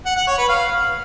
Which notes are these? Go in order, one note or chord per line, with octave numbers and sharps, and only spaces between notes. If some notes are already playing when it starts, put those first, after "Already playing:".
F#5
F#5
C#5
B4
F5